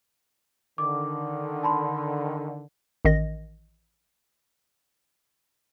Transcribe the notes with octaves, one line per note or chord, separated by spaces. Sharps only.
D3 D#3 D6
A5 B5 C6
A1 D#3 D#5 A#6